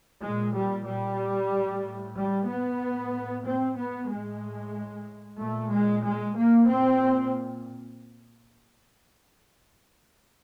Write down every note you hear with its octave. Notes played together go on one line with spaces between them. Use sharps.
A#2 G#3
G3
G3
A2
G3
B3
A2
C4
B3
A2 G#3
A#2 A3
G#3
G#3
A#3
A#2 C4